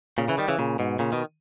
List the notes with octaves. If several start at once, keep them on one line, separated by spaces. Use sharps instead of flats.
A#2 C#3
C#3 E3
D#3 G3
C#3 E3
A#2 C#3
G#2 B2
A#2 C#3
B2 D#3